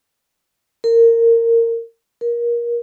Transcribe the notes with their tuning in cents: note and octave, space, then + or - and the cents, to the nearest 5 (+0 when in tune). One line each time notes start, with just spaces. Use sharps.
A#4 -20
A#4 +25